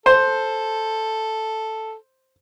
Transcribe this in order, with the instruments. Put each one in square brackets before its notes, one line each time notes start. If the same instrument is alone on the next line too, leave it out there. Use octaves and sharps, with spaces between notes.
[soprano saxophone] A4 [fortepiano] C5